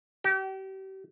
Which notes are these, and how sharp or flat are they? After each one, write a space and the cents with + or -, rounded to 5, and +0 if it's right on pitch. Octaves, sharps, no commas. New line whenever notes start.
G4 -35